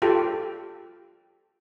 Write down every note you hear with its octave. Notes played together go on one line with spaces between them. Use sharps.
F4 G4 A4